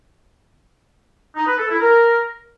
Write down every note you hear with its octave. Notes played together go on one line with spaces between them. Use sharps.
D#4
B4
A4
E4
A#4